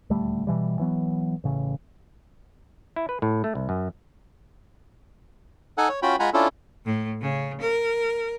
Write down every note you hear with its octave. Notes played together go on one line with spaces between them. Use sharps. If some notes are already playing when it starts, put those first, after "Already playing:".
D#1 D2 G3 A3
B2 E3 G3
E3 F#3 B3
A1 C#3
E4
B4
A2
A3
C2
F#2
D#4 A4 F#5 G#5
C#5
C#4 F4 F#4 G5 B5
G#3 F4 F#5 G#5 A#5 B5
C#4 D4 E4 F4 A4
A2
C#3
A#4